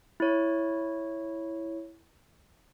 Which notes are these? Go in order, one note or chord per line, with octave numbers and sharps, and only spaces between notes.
E4 C#5